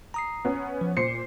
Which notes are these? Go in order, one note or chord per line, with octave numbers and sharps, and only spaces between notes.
A#5 D#6 C7
B3 C#4
F3
A#2 C5 C7 C#7